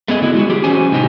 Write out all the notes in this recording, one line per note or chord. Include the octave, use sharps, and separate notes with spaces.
A3 B3 G#4 D#5
D3 E4 F#4
G#3 F4 F#4
F#3 G4 G#4
E3 C#4 F#4 C5 G#5
A2 C3 A3 C4 D#4 G4